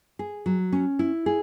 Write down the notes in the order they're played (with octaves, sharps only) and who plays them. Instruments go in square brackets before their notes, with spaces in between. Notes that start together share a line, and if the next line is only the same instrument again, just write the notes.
[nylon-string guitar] G#4
F#3
C#4
E4
G#4